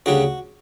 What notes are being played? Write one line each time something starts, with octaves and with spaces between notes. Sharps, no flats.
D2 C#3 G3 D4 F#4